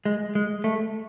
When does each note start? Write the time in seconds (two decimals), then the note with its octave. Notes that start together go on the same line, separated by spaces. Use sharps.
0.05 G#3
0.35 G#3
0.64 A3